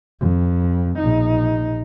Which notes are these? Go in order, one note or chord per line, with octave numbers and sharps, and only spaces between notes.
F2
A#1 D#4